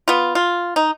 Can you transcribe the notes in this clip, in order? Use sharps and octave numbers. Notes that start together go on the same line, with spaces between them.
B3 F4
F4
D#4